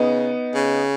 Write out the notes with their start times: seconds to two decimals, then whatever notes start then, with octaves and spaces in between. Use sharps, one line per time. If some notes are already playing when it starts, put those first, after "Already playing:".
Already playing: C#3 B3 D#4
0.54 C#3